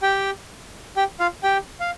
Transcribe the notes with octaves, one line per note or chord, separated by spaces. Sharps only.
G4 G5
G4 G5
F4 F5
G4 G5
F5